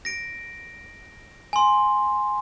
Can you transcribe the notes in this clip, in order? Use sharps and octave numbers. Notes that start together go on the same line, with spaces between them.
A#6 D7
G#5 C6